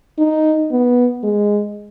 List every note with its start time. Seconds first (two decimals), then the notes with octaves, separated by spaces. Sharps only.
0.19 D#4
0.71 B3
1.24 G#3